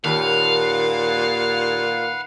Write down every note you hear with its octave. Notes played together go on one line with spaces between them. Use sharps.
D#2 A#2 B4 F5 F#5